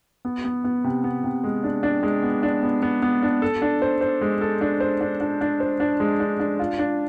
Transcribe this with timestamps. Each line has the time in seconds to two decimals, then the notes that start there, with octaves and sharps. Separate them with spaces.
0.25 B3
0.45 B3
0.64 B3
0.84 C3
1.04 B3
1.24 C3
1.44 G#3
1.63 D4
1.83 D4
2.03 G#3
2.23 B3
2.43 D4
2.63 B3
2.83 B3
3.02 B3
3.22 D4
3.42 A4
3.62 D4
3.82 C5
4.01 C5
4.21 G#3
4.41 A4
4.61 D4
4.80 C5
5.01 D4
5.20 D4
5.41 D4
5.60 C5
5.80 D4
6.00 G#3
6.20 D4
6.40 D4
6.59 F4
6.79 D4